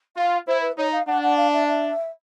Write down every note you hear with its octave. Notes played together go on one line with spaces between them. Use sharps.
F4 F5
E4 C5
B4
D#4 C#5
F5
D4 F#5
F#5
F5
E5
E5